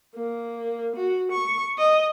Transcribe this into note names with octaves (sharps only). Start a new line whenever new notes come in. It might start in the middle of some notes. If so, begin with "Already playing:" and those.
A#3
F#4
C#6
D#5